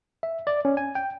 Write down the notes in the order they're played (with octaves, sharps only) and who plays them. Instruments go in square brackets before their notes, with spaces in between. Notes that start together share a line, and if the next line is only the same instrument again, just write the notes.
[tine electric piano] E5
D5
C#4
G#5
G5